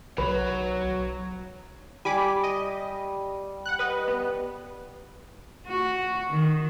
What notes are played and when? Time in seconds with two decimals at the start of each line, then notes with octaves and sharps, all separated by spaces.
0.18 B1 F#3 B4
2.05 G3 G#5 B5 D6
2.44 D#5
3.66 F#5 F#6
3.79 B4 D#5
4.08 B3
5.67 F#4
6.30 D#3